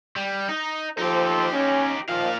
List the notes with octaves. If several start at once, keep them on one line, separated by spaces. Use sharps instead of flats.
G3
D#4
F3 D#4 G4 A4 C5
C#4
A#2 D#3 F3 F5